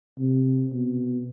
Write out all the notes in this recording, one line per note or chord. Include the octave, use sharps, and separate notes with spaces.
C3
B2